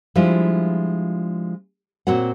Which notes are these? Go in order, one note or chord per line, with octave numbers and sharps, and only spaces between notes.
F3 G3 G#3 D4 E4 F4
A#2 C4 F#4 C#5 F#5